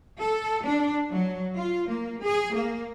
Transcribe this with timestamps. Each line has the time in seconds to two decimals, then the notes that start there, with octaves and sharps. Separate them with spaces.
0.21 A4
0.65 D4
1.11 F#3
1.56 F4
1.89 A#3
2.22 G#4
2.54 A#3